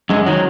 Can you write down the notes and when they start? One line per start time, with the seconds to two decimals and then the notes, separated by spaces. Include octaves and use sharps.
0.10 F#2 G#3
0.26 D#3 F#3